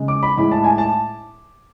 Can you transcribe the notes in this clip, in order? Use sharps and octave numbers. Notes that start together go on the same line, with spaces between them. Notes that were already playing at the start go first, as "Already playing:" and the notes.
Already playing: C#3 G#3
D6
B5
A2 G#3 B5
A5
G#5
A5